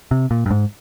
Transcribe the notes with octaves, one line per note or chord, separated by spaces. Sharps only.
C3
A#2
G2
G#2